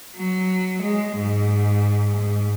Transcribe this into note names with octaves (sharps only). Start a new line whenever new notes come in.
F#3
G#3
G#2
G#2